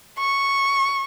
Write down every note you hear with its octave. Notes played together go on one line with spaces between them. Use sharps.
C#6